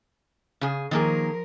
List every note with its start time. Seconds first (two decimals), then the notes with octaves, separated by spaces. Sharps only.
0.61 C#3 G#4
0.91 D#3 F3 A#3 G#4 A#4